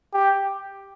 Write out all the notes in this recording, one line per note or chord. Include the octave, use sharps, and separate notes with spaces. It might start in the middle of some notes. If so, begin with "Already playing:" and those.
G4